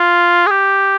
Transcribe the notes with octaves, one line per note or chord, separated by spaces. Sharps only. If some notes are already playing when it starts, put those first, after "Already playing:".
Already playing: F4
G#4
G4